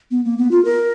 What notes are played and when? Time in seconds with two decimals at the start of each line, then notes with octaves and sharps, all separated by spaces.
0.11 B3
0.25 A#3
0.38 B3
0.51 F4
0.65 A#4